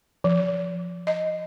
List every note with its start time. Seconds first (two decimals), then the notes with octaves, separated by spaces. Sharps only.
0.24 F3
1.07 D#5